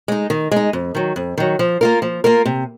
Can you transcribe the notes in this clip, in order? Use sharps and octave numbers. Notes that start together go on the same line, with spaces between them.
G#3 D#4
D#3
G#3 D#4
F2
D#3 F#3
F2
D#3 F#3
F3
A#3 F4 A#4
F3
A#3 F4 A#4
C3